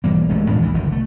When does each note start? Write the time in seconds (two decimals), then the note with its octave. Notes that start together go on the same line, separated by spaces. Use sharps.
0.04 B1 E3 G3 A#3
0.29 D#1 G#3 A3 C#4
0.49 A#2 E3 D4
0.62 D2 E3
0.74 F#1 C2 D3 D#3
0.92 A3